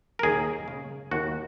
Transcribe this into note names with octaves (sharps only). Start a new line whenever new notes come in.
A#4
D#2 G#4
C#3
D#2 F#4